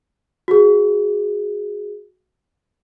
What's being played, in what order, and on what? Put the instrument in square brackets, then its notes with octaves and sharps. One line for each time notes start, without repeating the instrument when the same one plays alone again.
[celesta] F#4 G#4